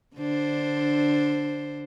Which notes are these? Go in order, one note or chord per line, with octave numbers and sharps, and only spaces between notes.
D3 D4 C5